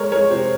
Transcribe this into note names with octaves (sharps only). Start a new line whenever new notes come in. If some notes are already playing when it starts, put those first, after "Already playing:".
Already playing: G#3 A#4 C#5
G#3 A#4 C#5
C3 C5